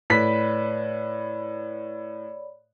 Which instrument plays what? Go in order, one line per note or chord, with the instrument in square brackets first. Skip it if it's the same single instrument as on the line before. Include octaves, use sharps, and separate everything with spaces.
[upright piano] A2 B4 B6 [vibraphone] C#5 D5 B5